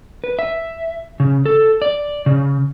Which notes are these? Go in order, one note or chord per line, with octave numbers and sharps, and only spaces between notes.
B4
E5
C#3
A4
D5
C#3